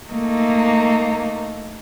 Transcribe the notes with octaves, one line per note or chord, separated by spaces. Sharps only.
A3 A#3 D#4